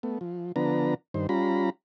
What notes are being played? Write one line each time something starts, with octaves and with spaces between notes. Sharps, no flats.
A3 B3
F3
D3 F3 B3 D4 B4 A#5
G2 D#3 C5
G3 C#4 F4 A#5 B5